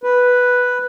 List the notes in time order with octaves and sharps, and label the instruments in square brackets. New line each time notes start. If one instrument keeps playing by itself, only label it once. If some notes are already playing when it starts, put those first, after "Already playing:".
[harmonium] B4